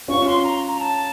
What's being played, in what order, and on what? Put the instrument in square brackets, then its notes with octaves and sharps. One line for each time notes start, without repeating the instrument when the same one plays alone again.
[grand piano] C#4 F4 [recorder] C#6
[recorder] C6
A#5
A#5
A5